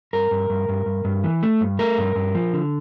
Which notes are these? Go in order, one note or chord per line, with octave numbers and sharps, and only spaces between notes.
G2 A#4
G2
G2
G2
G2
G2
E3
A3
G2
A3 A#4
G2
G2
F3
D3